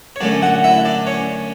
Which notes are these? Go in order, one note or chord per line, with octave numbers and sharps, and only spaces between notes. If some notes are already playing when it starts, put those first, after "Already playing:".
C#5
F#2 D3 A3 C#4 D4 D5
F#4 F#5
E4 E5
D4 D5
C#4 C#5